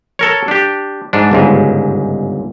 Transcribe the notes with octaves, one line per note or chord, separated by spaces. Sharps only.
A4 A#4 C#5
D4 G4
G#2 D4
G1 C#2 G#2